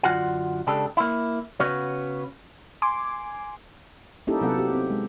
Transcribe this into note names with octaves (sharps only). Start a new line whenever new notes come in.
F#2 D3 F4 F#4 F#5
C#2 C#3 D4 G4 A4
A#3 E4
C#3 B3 C#4 F#4 C#5
G#5 C6 D6
A#3 C#4 D#4 E4 G4 A4
C3 F#3 B3 A4 F#5
G4
C4
G#3